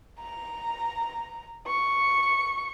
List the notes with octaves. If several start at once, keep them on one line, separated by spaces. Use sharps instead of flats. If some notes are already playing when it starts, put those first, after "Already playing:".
A#5
C#6